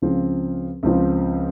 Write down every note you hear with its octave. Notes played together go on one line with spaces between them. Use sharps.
C#2 C#3 F3 C4 F4
C#2 C#3 F3 C4 F4